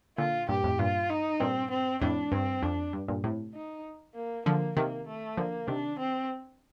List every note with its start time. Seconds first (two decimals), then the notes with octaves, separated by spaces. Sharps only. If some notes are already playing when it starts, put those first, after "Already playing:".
0.18 A#2 D3 F4
0.49 G2 A#2 G4
0.64 F2 A2
0.79 G2 A#2 F4
1.10 D#4
1.40 G2 A#2 C4
1.71 C4
2.02 F2 A2 D4
2.32 G2 C4
2.63 F2 D4
2.93 G2
3.08 G2 A#2
3.24 A2 C3
3.54 D#4
4.15 A#3
4.46 D3 F3 A#3
4.77 C3 D#3 A#3
5.07 A3
5.37 D3 F3 A#3
5.68 C3 D#3 D4
5.99 C4